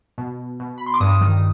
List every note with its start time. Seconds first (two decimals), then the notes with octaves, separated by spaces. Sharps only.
0.18 B2
0.60 B2
0.78 B5
0.86 C6
0.94 D6
1.00 G2 D#6
1.21 D#3